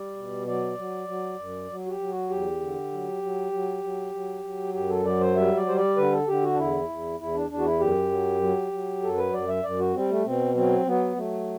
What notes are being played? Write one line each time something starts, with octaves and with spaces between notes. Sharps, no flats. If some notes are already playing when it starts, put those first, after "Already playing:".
Already playing: G3 D5
B2
F#3 D5
F#3
F#3
F#2
F#3
F#4
G4
F#3
F#4
E2 G4
D3
F#3
F#3
F#3
F#3
F#3
F#3
F#2 G4
A4
F#3 D5
C5
G3 E5
D5
G3 C5
D5
D3 B4
A4
D3 G4
F#4
D4
E2 E4
E2
E2 E4
D4
E2 D4
F#4
E4
F#2 G4
F#3
F#3
F#3
F#2 A4
B4
F#2 D5
E5
F#2 D5
F#4
G3 C4
A3
B2 C4
F#3 C4
F#3 B3
F#3 A3